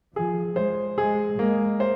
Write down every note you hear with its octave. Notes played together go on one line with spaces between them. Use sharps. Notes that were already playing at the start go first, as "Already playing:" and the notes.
F3 G#4
G#3 C5
G#3 G#4
G#3 A#3
C5